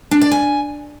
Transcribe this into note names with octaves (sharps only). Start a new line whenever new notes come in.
D4
D5
G#5